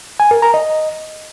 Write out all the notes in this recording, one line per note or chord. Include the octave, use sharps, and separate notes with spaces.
G#5
A#4
A#5
D#5